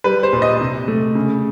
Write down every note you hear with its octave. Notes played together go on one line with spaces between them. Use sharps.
G3 B4
C5
A#2
D#5
C3
A3
C#3